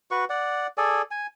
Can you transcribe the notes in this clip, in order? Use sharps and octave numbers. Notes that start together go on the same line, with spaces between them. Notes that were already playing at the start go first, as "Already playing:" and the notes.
F#4 B4 C#6
D5 F#5
G#4 A4 D5 G#5
G#5